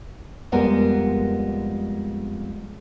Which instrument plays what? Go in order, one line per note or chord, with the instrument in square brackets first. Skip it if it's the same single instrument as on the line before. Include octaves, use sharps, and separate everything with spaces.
[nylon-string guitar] F2 G3 G#3 B3 A#4 G#5